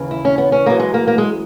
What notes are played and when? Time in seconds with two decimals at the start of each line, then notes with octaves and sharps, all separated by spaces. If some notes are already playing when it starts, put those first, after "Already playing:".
Already playing: D#2 C#3 E3
0.11 E4
0.25 C#4
0.38 B3
0.52 C#4
0.66 F#2 E3 A#3
0.79 G#3
0.94 A#3
1.07 A#3
1.18 G#3